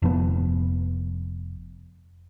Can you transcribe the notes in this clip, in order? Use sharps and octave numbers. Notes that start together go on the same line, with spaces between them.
F1 F3 B3